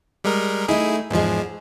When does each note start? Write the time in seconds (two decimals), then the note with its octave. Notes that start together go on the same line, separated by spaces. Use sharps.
0.24 G3 G#3 A#4
0.68 A3 D#4 E4 G#4
1.10 E2 G#2 F3 G#3